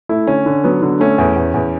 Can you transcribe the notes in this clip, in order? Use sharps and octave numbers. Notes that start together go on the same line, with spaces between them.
A3 E4
D3 C#4
D3
F#3 B3
D3
A3 C#4
E2
E2
E2